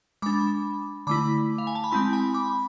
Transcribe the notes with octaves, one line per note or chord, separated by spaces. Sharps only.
G#3 D4 B5 D6
D3 A3 E4 B5 D6
F5
G#5
A5
B5
G#3 C4 E4 A5 C6
G#5 B5
B5 D6